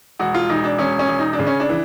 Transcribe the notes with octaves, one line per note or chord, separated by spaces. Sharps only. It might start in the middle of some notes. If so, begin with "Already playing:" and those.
E1 F#4
F4
E1 D#4
D4
E1 C#4
C#4
E1
D#4
D4
C#3
C#4
D4
E3